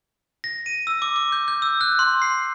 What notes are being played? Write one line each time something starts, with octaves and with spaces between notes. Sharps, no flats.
A#6
D#7
E6
D6
D6
G6
G6
E6
F#6
C6
C7